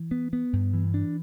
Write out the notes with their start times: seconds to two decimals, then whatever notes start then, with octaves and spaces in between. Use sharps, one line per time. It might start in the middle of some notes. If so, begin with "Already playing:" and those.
Already playing: E3
0.11 B3
0.33 B3
0.53 G2
0.73 E3
0.94 D4